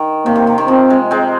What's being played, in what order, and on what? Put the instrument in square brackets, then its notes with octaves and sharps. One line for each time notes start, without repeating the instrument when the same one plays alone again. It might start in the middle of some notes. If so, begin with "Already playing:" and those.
Already playing: [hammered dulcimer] D#3
[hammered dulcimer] C3 [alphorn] A#3
[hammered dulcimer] C3
C3
D#3
[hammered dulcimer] F3 [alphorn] C4
[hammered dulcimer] G#3
G#3 C4